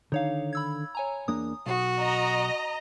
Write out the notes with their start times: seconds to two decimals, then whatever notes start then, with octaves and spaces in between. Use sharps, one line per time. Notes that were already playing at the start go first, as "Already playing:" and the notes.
0.12 D3 D#3 D#4 C#5 F5
0.53 B5 E6 G#6
0.95 C#5 G#5 A#5
1.28 E2 A#3 D4 D#6
1.66 B1 F#4
2.00 D#5 A#5